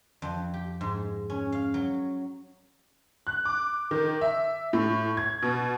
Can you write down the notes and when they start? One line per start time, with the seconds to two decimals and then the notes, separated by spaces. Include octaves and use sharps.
0.22 F2
0.54 G4
0.81 G#2
1.30 C#4
1.52 F5
1.74 F#3
3.27 F#6
3.45 D6
3.91 D#3
4.21 E5
4.73 A2
5.17 G#6
5.43 B2